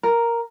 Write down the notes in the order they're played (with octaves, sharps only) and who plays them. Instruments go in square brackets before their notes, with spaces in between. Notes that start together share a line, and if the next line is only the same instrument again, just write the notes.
[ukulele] A#4